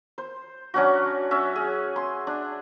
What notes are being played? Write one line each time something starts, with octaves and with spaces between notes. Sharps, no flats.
C5
F#3 C#4 D4 F#4
C#4 E5
G#4
C6
D4